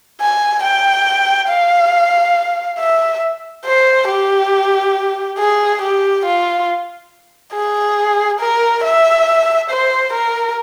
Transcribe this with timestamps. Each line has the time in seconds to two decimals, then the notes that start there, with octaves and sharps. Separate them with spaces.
0.21 G#5
0.64 G5
1.50 F5
2.79 E5
3.65 C5
4.09 G4
5.39 G#4
5.82 G4
6.25 F4
7.54 G#4
8.40 A#4
8.84 E5
9.70 C5
10.13 A#4